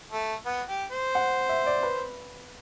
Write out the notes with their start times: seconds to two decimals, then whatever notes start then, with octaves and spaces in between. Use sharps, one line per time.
0.11 A3
0.46 B3
0.69 G4
0.92 C5
1.15 F#5
1.49 E5
1.66 D5
1.83 B4